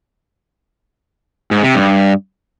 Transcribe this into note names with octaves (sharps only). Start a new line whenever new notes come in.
G#2
C3
G2